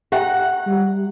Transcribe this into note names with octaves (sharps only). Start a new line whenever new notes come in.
G4 E5 F#5 G5 A#5
G3